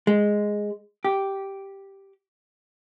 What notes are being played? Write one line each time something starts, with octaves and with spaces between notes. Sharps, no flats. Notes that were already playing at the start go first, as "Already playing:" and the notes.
G#3
G4